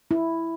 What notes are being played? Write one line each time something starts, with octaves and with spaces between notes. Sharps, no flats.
E4